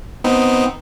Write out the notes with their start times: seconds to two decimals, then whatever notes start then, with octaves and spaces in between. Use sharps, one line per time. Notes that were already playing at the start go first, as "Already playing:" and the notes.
0.24 B3 C4 D#4